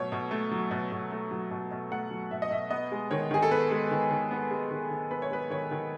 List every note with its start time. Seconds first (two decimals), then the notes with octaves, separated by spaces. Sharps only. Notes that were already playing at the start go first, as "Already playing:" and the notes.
Already playing: B2 F#3 A3 C#5
0.12 B2
0.31 A3
0.51 F#3
0.71 B2
0.92 B2
1.12 A3
1.31 F#3
1.51 B2
1.71 B2
1.91 A3 F#5
2.11 F#3
2.31 B2 E5
2.42 D#5
2.51 B2 E5
2.71 B3 D#5
2.92 G#3
3.11 D#3 C#5
3.31 D#3 G#4
3.42 A4
3.51 B3 B4
3.71 G#3
3.91 D#3
4.11 D#3
4.31 B3
4.51 G#3
4.71 D#3
4.90 D#3
5.11 B3 B4
5.22 C#5
5.31 G#3 B4
5.50 D#3 C#5
5.71 D#3